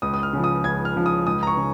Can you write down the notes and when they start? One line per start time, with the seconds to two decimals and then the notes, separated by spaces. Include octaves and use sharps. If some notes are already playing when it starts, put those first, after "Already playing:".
0.02 C#2 D#6
0.14 D#6
0.23 F6
0.33 C#3 F3
0.44 D#6
0.64 C#2 G#6
0.85 F6
0.96 C#3 F3
1.06 D#6
1.27 C#2 D#6
1.43 A#5
1.47 C#6
1.57 C#3